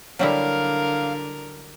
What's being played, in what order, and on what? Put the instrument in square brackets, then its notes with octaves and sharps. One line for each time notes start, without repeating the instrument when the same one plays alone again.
[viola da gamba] D3 A#4 [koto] F#3 G3 E4 [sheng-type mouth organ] F5